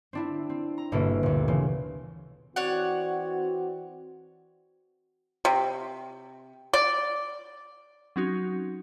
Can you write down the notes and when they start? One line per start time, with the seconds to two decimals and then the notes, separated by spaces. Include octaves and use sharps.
0.13 C4 D4 E4
0.49 C4
0.78 A#5
0.92 G1 B2 A#3 A4 E5 D7
1.23 D2 A#2
1.48 C#3 E3 C4
2.56 E3 C4 F#4 C#5 D5 F#5
5.45 C3
6.73 D5
8.16 F#3 C4 C#4 D#4 F#4